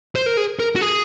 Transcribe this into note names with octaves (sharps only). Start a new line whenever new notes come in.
C5
A#4
G#4
A#4
F#4
G#4